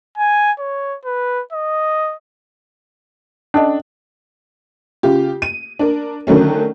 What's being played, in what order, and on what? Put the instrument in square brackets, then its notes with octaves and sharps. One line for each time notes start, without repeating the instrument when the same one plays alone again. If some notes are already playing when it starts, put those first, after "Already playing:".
[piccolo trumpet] G#5
C#5
B4
D#5
[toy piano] C#4 A4 D#5 [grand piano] D4
[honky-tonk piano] C#3 F4 G4
D#7
D4 A#4
D3 D#3 F#3 A3 C#4